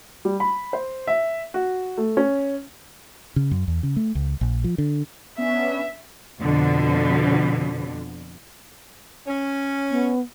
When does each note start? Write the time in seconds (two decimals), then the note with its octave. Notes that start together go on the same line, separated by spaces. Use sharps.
0.25 G3
0.40 B5
0.73 C5
1.07 E5
1.54 F#4
1.98 A3
2.17 C#4
3.36 C#3
3.51 F#2
3.68 E2
3.83 C#3
3.96 A3
4.15 C#2
4.41 A#1
4.64 F3
4.78 D3
5.38 B3 C#4 D4 E5
6.41 F2 B2 D3
9.28 C#4
9.91 B3